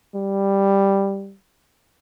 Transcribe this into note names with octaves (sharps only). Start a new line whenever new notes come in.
G3